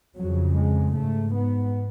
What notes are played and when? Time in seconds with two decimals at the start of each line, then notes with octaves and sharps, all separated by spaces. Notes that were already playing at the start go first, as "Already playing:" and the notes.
0.17 F2 C#3 F#3
0.57 G#3
0.96 G#2 A3
1.35 B3